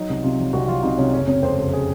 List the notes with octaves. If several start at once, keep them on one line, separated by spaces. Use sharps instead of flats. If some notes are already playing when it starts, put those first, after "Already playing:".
Already playing: F#3 D#4
C2
C3 F4
F#3
C2 F#4
F#3 F4
C2 D#4
C3 C#4
F#1 C#4
C3 C#4
F2 C5
F#1
G#4